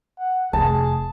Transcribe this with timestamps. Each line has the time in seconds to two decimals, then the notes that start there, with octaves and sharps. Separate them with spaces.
0.18 F#5
0.53 F1 G#4 A5